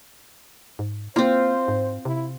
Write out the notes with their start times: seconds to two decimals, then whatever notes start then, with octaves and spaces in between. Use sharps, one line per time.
0.79 G#2
1.16 A#3 C4 F4 C5
1.68 G#2
2.05 C3 E4